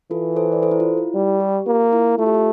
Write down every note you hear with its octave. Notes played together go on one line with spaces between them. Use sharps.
E3 F4 A4
A4 C5
D5
A4 C5
E4
F4
E4
G3
G4
A#3 F4
E4
A3 F4
G4
F4